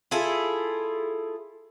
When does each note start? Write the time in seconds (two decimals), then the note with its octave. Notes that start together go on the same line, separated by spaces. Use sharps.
0.11 E4 F4 G#4 A4